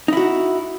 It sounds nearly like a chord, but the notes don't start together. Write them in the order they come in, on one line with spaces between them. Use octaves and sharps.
D#4 E4 F#4